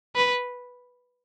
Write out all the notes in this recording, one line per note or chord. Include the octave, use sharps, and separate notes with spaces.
B4